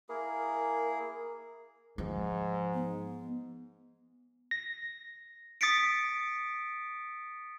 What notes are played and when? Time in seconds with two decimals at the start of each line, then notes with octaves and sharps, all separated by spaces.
0.09 A#3 E4 G#4 A#4
1.98 G#2 F3
2.74 B3
4.51 A#6
5.61 D#6 A6 B6 C#7 D7